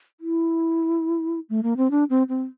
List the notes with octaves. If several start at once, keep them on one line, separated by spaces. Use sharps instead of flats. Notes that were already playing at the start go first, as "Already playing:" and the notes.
E4
A3
A#3
C4
D4
C4
C4